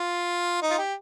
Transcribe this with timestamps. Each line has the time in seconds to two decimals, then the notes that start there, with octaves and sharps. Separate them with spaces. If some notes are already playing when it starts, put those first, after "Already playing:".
Already playing: F4
0.62 D#4
0.70 F4
0.78 G4